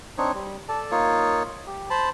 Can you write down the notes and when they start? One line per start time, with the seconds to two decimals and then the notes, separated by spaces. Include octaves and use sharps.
0.18 C4 D4 D#4 C#5
0.34 G3
0.69 A4 D5 A5
0.91 A#3 D#4 F4 C#5
1.67 G4
1.90 C5 A5 B5